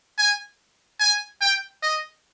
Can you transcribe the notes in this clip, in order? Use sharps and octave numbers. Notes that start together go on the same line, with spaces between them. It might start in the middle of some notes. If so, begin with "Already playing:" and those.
G#5
G#5
G5
D#5